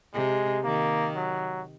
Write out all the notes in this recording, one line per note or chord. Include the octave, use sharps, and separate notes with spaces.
C3 G#3
D#3 A#3
F#3